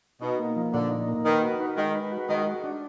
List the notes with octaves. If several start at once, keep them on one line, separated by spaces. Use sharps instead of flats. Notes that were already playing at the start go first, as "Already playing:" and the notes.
B2 D#4
A#3
F3
A#2 D3
D#4
A#3
D#3 B4
F#4
D#4
D#3 G#3
B4
F#4
D#3 G#3
F#4
D4